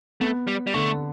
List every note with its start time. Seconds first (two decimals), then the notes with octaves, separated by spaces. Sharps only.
0.21 A3 B3
0.47 G3
0.67 G3
0.74 D3 A3